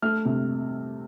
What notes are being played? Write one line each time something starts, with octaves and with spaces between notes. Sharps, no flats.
A3 F6
C3